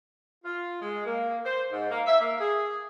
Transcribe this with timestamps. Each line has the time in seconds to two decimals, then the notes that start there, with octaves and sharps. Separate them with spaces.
0.44 F4
0.81 G#3
1.05 A#3
1.45 C5
1.71 G#2
1.90 A#3
2.06 E5
2.20 A#3
2.40 G#4